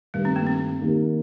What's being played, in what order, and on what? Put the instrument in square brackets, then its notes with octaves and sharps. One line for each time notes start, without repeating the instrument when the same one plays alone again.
[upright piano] G2 D#3 A3 [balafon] G3
[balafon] C4
A#3
C4
[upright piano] D#3 A#3 D#4 G4